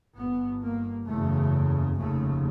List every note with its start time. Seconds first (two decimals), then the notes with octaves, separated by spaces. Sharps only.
0.16 G1 G2 B3
0.62 A#3
1.07 F#1 E2 C#3 A3
1.98 F1 D#2 C#3 A3